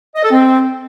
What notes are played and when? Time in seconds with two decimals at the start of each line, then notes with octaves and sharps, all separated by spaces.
0.15 D#5
0.23 A4
0.32 C4